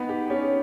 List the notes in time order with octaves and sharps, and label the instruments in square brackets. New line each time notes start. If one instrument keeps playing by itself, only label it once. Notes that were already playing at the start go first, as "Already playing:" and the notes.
Already playing: [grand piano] B3 [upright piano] D#4
[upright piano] G4
[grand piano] C#4 [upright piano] G4